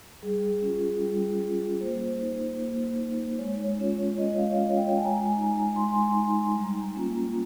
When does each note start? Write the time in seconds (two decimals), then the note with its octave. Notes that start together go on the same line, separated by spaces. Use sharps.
0.23 G3 G#4
0.62 C#4 F4
1.02 G3
1.41 C#4 F4
1.80 A#3 C5
2.21 D#4
2.60 A#3
3.00 D#4
3.38 G#3 C#5
3.78 C#4 F4
4.18 G#3 D#5
4.38 F5
4.49 C#5
4.58 C#4 F4 D#5
4.77 G5
4.97 G#3 G#5
5.04 A#5
5.11 G#5
5.19 A#5
5.26 G#5
5.32 A#5
5.36 D#4 G#5
5.76 G#3 C6
5.84 A#5
5.93 G#5
6.01 A#5
6.15 D#4
6.55 G3
6.95 A#3 C#4 F4